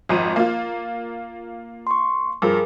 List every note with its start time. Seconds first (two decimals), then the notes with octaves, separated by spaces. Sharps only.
0.09 G#1 F2 D#7
0.36 A#3 F4
1.87 C6 C#6
2.42 G2 F3 G#4 A#4 D6